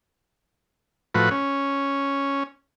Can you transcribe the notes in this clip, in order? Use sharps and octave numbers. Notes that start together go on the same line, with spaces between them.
A2 F3 F#4 B4
C#4